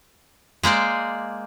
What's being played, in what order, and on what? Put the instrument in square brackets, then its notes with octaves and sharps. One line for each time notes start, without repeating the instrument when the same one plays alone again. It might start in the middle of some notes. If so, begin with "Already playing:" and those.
[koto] G#3 A#3 C5 D5